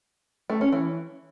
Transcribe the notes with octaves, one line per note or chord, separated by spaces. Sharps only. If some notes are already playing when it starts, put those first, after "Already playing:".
A3
C#4
E3